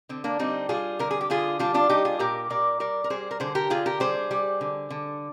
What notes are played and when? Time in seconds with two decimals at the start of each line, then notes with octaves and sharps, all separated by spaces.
0.09 D3 C4
0.24 A#3 D4
0.39 G3 C4 D#4
0.69 G3 F4 G#4
0.99 D3 A#4
1.11 G#4
1.21 G4
1.30 D3 F4 G#4
1.59 G3 D4 F4
1.74 D4 F4
1.89 G3 D#4 G4
2.05 F4 G#4
2.19 A#2 G4 A#4
2.50 A#2 A#4 D5
2.80 G3 A#4 D5
3.04 A#4
3.10 G3 G#4 C5
3.31 A#4
3.40 D3 G#4 C5
3.55 G4 A#4
3.70 D3 F4 G#4
3.86 G4 A#4
4.00 G3 G#4 C5
4.31 G3
4.61 D3
4.90 D3